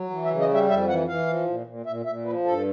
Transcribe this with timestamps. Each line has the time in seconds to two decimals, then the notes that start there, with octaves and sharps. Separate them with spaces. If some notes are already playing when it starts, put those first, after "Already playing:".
Already playing: F#3
0.10 E3
0.25 E5
0.30 C#3
0.40 D#5
0.49 G3
0.54 E5
0.69 F2 E5
0.88 E3 F#5
1.08 E3 F5
1.27 F3
1.47 A#2
1.67 A#2
1.86 A#2 E5
2.05 A#2 E5
2.25 F3 B4
2.44 G2 A4